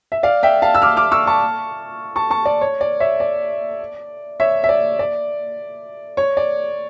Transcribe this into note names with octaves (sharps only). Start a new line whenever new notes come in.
E5
D5 F5
E5 G5
F5 A5
E6
D6 F6
D6 F6
C#6 E6
A5 C#6
A5 C#6
A5 C#6
D5
C#5
D5
C#5 E5
D5
C#5 E5
E5
D5
D5
C#5
D5